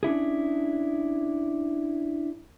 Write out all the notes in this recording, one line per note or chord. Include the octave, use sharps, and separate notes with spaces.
C#4 D4 E4 G#4